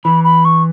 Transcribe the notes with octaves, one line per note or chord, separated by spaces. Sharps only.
E3 B5
B5
C#6